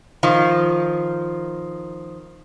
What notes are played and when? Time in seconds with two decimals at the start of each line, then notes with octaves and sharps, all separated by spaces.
0.23 D#3 F3